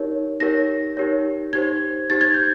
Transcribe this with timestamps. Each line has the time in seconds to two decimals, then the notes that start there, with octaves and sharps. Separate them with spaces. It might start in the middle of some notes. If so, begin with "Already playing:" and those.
Already playing: D#4 G4 A#4 C#5
0.40 D#4 G4 A#4 C#5 A#6
0.97 D#4 G4 A#4 C#5
1.53 D#4 G4 C5 G#6
2.10 D#4 G4 C5 A6
2.21 G#6
2.34 G6